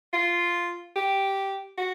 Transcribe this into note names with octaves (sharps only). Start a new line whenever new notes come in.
F4
G4
F#4